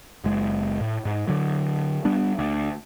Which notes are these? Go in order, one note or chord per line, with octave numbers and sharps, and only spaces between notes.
F#1 G#3
A2
G#2
D3 F#3
G3 B3 D4
D2